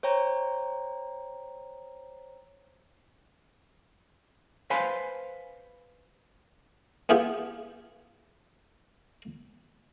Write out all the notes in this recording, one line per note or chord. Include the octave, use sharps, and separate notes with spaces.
C5 C#5 G5 A#5
B4 C5 F5 G#5 B5
B3 E4 F4 G4 G#4